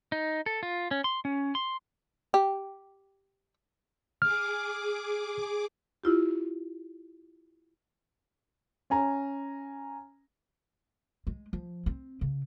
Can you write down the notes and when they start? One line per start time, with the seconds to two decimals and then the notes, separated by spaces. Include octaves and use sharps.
0.12 D#4
0.46 A4
0.63 F4
0.91 C#4
1.04 C6
1.25 C#4
1.55 C6
2.34 G4
4.22 G#4 D6 F6
6.04 E4 F4 G4
8.90 C#4 G#5 A#5
11.27 G#3
11.53 F3
11.86 C4
12.21 C#3